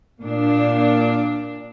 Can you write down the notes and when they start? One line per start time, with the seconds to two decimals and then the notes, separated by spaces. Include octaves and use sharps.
0.21 A#2 D4